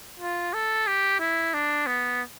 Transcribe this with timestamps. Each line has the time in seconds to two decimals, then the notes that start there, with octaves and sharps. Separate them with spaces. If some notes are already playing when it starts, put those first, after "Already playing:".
0.20 F4
0.54 A4
0.87 G4
1.20 E4
1.54 D4
1.87 B3